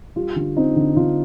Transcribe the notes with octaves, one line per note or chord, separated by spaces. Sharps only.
G3 F4
D3
C4 D#4
D3
D3 F4